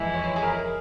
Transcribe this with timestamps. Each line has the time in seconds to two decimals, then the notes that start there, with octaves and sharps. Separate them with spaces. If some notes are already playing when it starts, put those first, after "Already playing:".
Already playing: F2 E3 G#3 E4 E5
0.14 C#5
0.36 G#4
0.43 A#4